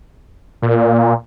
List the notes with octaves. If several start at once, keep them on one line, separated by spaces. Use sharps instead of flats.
A#2